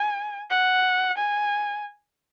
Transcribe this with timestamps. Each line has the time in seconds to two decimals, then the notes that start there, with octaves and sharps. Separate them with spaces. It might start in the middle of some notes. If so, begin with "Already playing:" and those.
Already playing: G#5
0.50 F#5
1.18 G#5